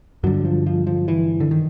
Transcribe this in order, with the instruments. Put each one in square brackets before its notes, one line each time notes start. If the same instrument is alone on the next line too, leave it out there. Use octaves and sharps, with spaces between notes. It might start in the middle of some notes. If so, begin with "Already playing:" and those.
[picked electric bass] G2 D3 F#3
F3
F3
F3
E3
D3
D#3